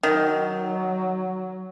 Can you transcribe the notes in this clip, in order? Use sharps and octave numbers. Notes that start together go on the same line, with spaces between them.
D#3 F#3